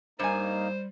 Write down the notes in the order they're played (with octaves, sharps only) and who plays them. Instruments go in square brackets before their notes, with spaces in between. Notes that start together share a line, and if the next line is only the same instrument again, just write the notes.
[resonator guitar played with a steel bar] G2 G#5 [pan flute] G3 [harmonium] A#3 D#4 [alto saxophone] C5